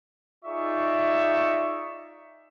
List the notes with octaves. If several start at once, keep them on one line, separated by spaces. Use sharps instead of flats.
D#4 F4 G#4 D5 E5 C#6